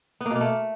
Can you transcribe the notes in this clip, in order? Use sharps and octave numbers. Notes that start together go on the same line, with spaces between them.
B3
A#3
B2
A#3
A3